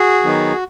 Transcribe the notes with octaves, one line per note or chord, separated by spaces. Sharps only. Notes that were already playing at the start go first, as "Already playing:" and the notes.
Already playing: F#4 G#4
D#3 F#3 B3 D#4